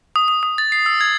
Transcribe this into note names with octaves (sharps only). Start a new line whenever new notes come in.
D#6
D#6
D#6
A6
C7
E6
G#6